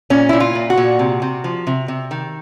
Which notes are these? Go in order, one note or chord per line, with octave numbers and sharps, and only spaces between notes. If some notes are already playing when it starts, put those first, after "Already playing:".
A#2 C#4
A#2 E4
F4
A#2
F#4
A#2
C3
C3
F3
C3
C3
D#3